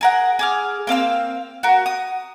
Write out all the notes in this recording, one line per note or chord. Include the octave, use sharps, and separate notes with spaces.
G#4 A#4 F#5
G#4 D6 F6
A#3 C4 F5 E6
F#4 A#4
D#6